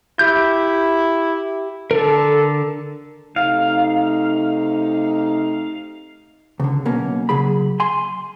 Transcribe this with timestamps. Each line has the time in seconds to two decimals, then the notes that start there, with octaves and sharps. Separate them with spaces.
0.19 E4 G4 G6
1.91 D3 A4 A#4
3.36 C3 A3 D#4 F5
6.60 C#2 D3
6.85 B1 B2 A#3 C#4
7.29 C#3 F#3 G#4 B5
7.80 G#5 C6